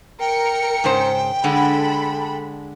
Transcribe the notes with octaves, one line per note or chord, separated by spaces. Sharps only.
A#4 G5 C#7
G#2 C#3 C5
D3 G#3 A4 B5